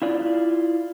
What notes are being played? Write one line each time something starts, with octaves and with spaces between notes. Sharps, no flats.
E4 F4 D5